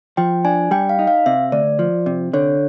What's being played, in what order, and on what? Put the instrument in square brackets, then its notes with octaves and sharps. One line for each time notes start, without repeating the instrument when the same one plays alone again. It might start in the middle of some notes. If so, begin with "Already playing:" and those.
[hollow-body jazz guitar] F3 [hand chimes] G5
[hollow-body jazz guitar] D4 [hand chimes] G#5
[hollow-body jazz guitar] G3 [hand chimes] G5
[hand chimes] F5
[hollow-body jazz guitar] D#4
[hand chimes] F5
[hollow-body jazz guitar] C3 [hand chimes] E5
[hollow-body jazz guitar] D2 [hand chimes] D5
[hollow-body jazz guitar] F3
C3
[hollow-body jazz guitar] D3 [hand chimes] C#5